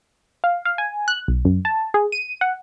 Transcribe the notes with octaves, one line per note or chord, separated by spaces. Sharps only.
F5
F5
G#5
F#6
B1
F#2
A5
G#4
D#7
F#5